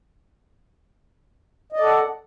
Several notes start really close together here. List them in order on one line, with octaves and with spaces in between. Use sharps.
D#5 D5 A4 F#5